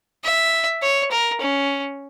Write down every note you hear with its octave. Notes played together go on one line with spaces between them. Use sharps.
E5
C#5
A#4
C#4